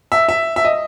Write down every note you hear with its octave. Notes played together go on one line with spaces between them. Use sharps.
E5
E5
E5
D#5